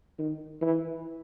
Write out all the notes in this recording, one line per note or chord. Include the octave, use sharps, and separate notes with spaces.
D#3
E3